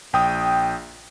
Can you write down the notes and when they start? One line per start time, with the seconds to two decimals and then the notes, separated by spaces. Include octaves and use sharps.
0.13 A#1 G5 D#6